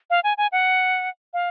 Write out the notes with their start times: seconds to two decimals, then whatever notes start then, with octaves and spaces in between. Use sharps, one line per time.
0.10 F5
0.24 G#5
0.38 G#5
0.52 F#5
1.34 F5